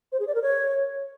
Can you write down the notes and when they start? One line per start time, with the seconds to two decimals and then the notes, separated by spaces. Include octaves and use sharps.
0.12 C5
0.20 G#4
0.27 D5
0.35 A#4
0.42 C#5